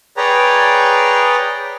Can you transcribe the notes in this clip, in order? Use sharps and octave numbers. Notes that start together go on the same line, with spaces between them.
G#4 B4 C#5 D5 G5 A#5